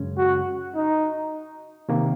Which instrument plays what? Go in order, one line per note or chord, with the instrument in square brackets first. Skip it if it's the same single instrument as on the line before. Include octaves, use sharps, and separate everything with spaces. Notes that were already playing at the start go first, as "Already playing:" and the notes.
Already playing: [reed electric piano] F#2 C#3 G#3 C#4
[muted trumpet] F#4
D#4
[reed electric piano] C3 D#3 A#3